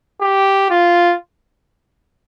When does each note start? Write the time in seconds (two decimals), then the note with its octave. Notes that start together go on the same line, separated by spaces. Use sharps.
0.21 G4
0.70 F4